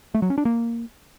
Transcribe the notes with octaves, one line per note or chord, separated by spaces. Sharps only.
A3
F#3
C#4
D4
A#3